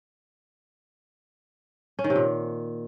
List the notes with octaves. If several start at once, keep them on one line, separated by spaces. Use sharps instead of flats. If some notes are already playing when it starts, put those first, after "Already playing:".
C#4
D#3
C3
A#2